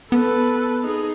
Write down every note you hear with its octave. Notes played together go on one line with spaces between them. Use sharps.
B3 A4 B4
D#4 G#4